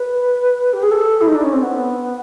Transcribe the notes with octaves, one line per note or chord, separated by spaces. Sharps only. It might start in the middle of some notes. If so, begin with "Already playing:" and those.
Already playing: B4
G4
G#4
A4
E4
D#4
D4
C#4
C4
B3